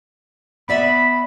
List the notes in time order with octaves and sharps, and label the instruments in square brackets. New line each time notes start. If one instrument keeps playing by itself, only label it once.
[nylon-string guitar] B3 D5 E5 [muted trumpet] B5